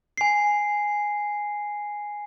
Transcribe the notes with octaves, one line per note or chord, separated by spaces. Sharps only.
G#5 C7